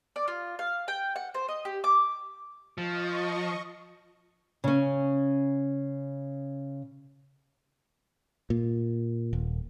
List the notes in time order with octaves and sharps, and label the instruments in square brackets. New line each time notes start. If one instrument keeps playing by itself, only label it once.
[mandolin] D5
F4
F5
G5
F#5
C5
D#5
G4
D6
[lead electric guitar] F3 [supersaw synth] D#5 C#6
[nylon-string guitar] C#3 C#4
[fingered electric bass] A#2
D#1